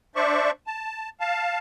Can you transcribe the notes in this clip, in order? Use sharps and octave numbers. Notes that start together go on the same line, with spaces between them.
D4 C5 D5 E5 C#6
A5
F5 A5